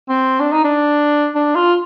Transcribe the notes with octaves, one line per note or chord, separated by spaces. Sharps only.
C4
D4
D#4
D4
D4
F4